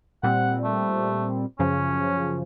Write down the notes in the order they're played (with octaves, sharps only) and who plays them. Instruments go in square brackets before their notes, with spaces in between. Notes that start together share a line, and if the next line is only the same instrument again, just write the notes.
[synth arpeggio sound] A#2 G3 C4 [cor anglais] F#5
[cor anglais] A3
[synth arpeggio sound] F#2 C#3 F3 [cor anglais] C#4